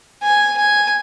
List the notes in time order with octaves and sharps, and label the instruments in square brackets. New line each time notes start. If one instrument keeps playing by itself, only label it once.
[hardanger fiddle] G#5
G#5